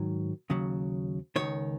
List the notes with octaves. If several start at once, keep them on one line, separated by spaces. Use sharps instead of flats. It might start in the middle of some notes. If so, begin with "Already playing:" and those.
Already playing: G#2 D#3 F#3
D#2 C#3 F#3
C#2 C3 D#3 C#5